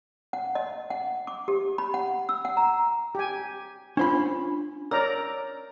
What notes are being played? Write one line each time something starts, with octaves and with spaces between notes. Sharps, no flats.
F#5
D#5
F#5
D6
G4
B5
F#5
E6
F#5
A#5
G4 G#5
C#4 D4 F4 C5 B5
A#4 C#5 D5 A#5 E6